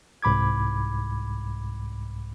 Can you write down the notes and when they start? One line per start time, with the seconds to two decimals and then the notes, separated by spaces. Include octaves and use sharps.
0.22 C2 G#2 B5 D6 G#6